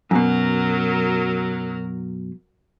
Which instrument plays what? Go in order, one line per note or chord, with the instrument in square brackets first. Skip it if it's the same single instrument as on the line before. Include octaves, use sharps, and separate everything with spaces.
[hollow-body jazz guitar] F#2 B2 [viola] F#3 A#4